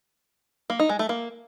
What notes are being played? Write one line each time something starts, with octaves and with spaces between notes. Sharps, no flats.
A#3
D#4
G#3
A3
A#3